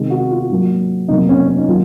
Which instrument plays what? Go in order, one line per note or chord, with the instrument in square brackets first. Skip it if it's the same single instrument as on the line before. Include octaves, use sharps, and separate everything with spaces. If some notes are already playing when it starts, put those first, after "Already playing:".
Already playing: [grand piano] C3 D#3 G#3
F#4
F4
G#2 F#3 A#3
F2 C3 F#3 A#3 D#4
C#4
C#4
D#4
D#3 F#3 A#3 F4